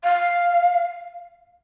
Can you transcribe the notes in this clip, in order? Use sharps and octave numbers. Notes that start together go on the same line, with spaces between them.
F5